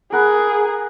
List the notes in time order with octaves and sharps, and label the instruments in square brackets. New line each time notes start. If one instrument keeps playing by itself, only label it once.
[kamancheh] G#4 [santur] A#4 F#5 B5